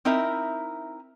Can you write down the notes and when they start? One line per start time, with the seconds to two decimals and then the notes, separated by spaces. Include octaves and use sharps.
0.05 C4 D#4 E4 A#4 E5